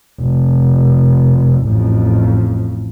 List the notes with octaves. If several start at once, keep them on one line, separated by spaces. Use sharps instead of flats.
F1
A1 F2